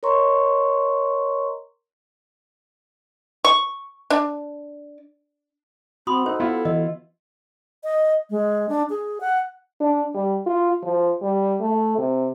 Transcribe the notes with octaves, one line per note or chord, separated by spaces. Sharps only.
A#4 C#5 D#5 A#5 C6 C#6
C#6
D4
C4 F#4 B5 C6 D#6
D#4 A4 C5
B3 E4 F4 F#5
E3 D#5
D#5
G#3
D4
G#4
F#5
D4
G3
F4
F3
G3
A3
C3